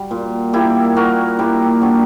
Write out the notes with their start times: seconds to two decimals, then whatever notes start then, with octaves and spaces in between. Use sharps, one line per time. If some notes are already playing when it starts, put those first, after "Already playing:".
Already playing: G3 F#4
0.11 A#2
0.53 A#3 E4 G4
0.96 A#2 F#4 A#4
1.39 A#2 E4 G4
1.82 G3 D4 F#4